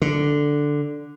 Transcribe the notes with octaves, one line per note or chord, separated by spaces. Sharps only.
D3